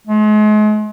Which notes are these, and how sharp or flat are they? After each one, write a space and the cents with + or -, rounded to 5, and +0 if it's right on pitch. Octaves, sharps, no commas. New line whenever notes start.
G#3 +40